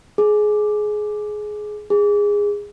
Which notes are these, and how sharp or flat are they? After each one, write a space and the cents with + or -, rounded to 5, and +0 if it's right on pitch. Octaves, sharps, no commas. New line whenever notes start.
G#4 +20
G#4 -15